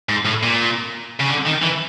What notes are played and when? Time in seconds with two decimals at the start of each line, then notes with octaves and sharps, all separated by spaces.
0.09 G#2
0.26 A2
0.43 A#2
1.20 C#3
1.28 D3
1.45 D#3
1.62 E3